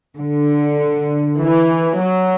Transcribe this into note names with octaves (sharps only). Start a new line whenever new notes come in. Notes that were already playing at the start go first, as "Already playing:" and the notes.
D3
E3
F#3